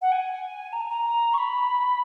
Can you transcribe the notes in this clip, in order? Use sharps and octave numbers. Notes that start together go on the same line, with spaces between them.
F#5
G#5
A#5
G#5
A#5
C#6
B5